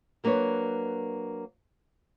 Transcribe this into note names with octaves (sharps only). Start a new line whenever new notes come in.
F#3 A#3 D4 B4 C#5